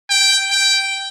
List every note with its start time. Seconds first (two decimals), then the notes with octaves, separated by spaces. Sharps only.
0.10 G5
0.51 G5